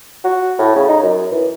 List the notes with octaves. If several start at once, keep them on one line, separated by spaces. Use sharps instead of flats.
F#4
A2
C#3
D#4
F#2
E3